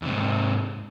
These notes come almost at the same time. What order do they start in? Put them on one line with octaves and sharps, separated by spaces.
E2 C3 G#2